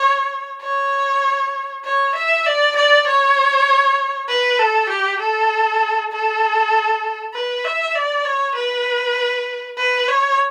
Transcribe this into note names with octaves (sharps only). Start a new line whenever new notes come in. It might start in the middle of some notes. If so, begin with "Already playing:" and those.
Already playing: C#5
C#5
C#5
E5
D5
D5
C#5
B4
A4
G4
A4
A4
B4
E5
D5
C#5
B4
B4
C#5